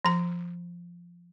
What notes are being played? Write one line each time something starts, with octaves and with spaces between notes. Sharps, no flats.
F3 A#5